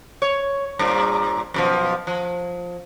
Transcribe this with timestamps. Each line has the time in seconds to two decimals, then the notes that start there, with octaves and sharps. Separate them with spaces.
0.22 C#5
0.79 G2 A#2
1.54 F#2 B2 F3
2.07 F3